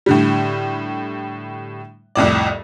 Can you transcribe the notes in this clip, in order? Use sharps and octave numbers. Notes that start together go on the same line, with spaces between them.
A2 D3 G3
C2 F2 A2 D5